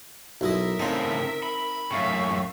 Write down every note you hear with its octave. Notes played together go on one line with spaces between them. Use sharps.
B1 E4 A#4 D#5 E5
A2 C#3 C4 D#4
B5
F#2 A2 E5 F5 C#6